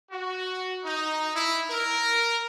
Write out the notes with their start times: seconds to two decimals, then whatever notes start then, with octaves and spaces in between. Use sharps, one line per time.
0.11 F#4
0.84 D#4
1.34 E4
1.69 A#4